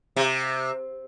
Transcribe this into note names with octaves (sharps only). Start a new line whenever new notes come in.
C3